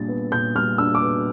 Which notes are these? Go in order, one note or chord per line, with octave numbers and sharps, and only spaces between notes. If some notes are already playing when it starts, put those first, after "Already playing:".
Already playing: A#2 G3 D4 A6
B3
A#2 G6
G3 F6
D4 E6
D6
B3